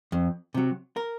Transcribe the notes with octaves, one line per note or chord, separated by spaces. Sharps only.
F2
C3 F#3
A#4